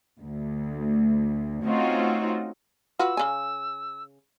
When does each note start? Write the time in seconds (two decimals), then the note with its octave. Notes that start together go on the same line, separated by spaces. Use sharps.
0.22 D2
1.65 A3 C4 C#4 D#4 F4 F#4
2.99 F4 F#4 B4 E6
3.17 C#3 G#5